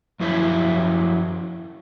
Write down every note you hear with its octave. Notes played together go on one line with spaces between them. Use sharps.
F#2 F3 F#3 E4 C#5 E5